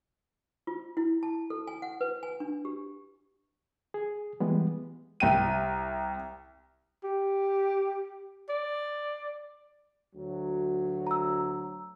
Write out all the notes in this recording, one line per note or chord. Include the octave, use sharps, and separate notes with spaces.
F4
E4
A5
A4
G#5
F#5
B4
G#5
D4
G4
G#4
E3 G3 G#3 B3
C2 G5 D#7
G4
D5
D2 F#3
A#5 E6